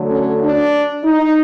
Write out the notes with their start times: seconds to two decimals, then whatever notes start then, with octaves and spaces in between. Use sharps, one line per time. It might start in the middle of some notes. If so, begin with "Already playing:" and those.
Already playing: D3 F#3 A3
0.09 C#4
0.41 D4
1.05 D#4